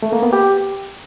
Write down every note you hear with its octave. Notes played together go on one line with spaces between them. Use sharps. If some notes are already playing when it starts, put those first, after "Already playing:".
A3
A#3
B3
G4